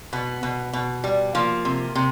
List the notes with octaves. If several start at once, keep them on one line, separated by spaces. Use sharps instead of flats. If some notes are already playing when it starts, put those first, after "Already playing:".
B2 B3
B2
B2
G3
F3 A#3
C3
C3